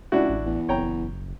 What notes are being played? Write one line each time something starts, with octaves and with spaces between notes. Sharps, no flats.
C#2 D4 E4 F#4
A1
E2
F#1 C#5 G5 A#5